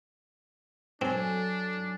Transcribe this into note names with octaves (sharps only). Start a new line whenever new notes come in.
F#3 C4 D4 A4 G#5